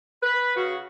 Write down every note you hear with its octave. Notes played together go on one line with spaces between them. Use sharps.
B4
C#3 F#4